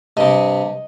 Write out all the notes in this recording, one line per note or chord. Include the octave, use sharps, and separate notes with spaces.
G2 C3 D#5